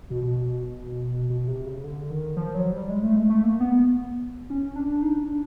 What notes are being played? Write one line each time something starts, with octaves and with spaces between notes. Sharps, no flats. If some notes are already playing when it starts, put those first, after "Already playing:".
B2
B2
B2
C3
C#3
D3
D#3
F3
F#3
G3
G#3
A3
G#3
A3
A#3
B3
C#4
D4
D#4
D4